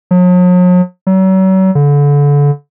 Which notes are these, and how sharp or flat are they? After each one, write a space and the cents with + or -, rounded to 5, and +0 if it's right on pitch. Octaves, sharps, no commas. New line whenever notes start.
F#3 -45
F#3 +40
D3 -30